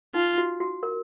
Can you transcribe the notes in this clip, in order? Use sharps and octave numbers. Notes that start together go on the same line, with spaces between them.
D#4 F4
F#4
F#4
A#4